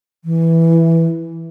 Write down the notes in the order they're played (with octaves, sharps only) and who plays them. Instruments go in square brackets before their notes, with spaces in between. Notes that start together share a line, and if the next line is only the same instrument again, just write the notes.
[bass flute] E3